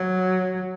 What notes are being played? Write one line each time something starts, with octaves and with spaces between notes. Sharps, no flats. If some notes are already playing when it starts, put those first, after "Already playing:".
Already playing: F#3